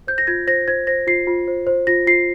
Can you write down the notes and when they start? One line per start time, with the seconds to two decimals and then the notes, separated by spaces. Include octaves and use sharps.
0.07 C5 G6
0.18 A#6
0.27 F4 G#6
0.47 C5 A#6
0.68 C5 G#6
0.87 C5 A#6
1.07 F4 C7
1.27 F4
1.48 C5
1.67 C5
1.87 F4 A#6
2.07 F4 C7